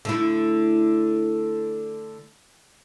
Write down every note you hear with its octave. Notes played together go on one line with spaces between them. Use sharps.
D3 A3 E4